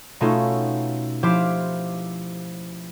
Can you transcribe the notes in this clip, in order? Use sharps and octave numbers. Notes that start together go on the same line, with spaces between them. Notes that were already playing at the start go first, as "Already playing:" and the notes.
B2 A3 C#4 D#4 F4 A4
F3 E4 G4 C5 D6 F6